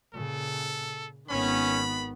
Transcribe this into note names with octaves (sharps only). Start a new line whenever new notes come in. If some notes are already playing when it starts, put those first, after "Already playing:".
A#2 C#3 A4
G#1 D#3 B3 C#4 B5